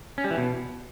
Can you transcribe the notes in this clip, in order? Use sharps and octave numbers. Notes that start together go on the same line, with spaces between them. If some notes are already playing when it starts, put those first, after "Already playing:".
C#4
G3
E3
B2